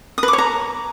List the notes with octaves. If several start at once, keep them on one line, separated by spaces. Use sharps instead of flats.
D#6
B4
D6
C#5
A#5